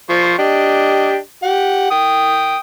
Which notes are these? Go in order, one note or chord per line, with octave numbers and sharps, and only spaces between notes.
F3 C5 C#6
D4 G4 D#5
G4 F#5
G5 D#6